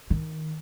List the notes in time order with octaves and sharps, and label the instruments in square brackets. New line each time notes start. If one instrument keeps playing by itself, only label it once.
[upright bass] D#3